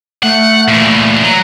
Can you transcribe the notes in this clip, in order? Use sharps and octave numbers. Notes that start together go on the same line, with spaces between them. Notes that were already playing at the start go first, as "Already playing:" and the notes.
A3 F#5
A#2 E3
F#3